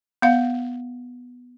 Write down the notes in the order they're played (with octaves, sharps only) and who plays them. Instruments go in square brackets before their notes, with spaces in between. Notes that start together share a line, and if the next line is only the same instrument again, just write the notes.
[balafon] B3 F5